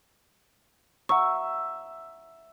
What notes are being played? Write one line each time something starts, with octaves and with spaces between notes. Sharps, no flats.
E5 F#5 A#5 C#6